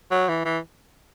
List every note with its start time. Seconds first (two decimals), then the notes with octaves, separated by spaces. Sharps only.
0.11 F#3
0.29 E3
0.45 E3